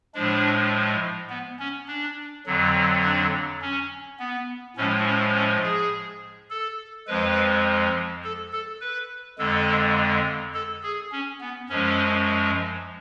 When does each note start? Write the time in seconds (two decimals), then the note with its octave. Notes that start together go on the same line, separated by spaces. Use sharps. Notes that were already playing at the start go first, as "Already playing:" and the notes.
0.15 A2 F3 G#3 D4
1.30 B3
1.59 C#4
1.88 D4
2.46 F2 D3 F#3
3.03 D4
3.62 C#4
4.19 B3
4.77 A2 F3 G#3 C#4
5.06 C#4
5.35 C#4
5.63 G#4
6.50 A4
7.07 F2 F3 G#3 B4
8.24 A4
8.52 A4
8.81 B4
9.38 F2 D3 G#3 A4
10.54 A4
10.83 G#4
11.12 C#4
11.40 B3
11.69 F#2 F3 G#3 C#4